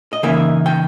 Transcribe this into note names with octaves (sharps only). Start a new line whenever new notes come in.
D#5
C#3 E3 A#3 D#4 E5
G5